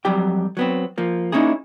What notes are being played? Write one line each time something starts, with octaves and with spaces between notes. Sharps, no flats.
F2 F#3 G3 G4 G5
F#3 B3 C4
F3 A#3
A#3 C#4 D#4 E4 G#4